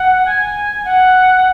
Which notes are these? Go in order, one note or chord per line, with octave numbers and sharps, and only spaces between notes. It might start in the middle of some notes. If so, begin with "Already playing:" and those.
Already playing: F#5
G#5
F#5